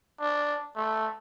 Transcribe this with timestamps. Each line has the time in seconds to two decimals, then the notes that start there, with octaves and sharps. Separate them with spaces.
0.20 D4
0.76 A3